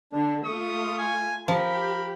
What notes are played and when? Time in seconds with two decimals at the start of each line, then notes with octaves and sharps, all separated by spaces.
0.13 D3 D4
0.45 A3 F4 C#6 D#6
0.99 G#5
1.48 F3 G4 A#4 B5